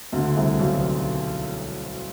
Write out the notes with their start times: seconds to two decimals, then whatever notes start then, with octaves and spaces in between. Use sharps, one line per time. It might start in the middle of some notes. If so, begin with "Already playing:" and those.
0.12 D2 D3
0.36 C2 C3
0.59 B1 B2